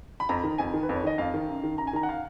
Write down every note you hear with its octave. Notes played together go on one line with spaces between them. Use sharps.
B5
F2 A#5
D#3
F2 G#5
D#3
B4
F2
C#5
D#3 D#5
F2 F5
D#3
F#2
D#3
F#2 A#5
G#5
D#3 A#5
F#5
F5